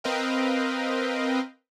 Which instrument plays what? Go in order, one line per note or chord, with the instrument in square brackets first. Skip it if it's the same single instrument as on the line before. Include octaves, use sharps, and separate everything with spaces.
[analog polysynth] C4 A#4 B4 D#5 F5 G5